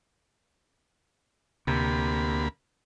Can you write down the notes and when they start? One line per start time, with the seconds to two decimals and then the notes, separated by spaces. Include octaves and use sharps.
1.67 D2 C3 A#3 B5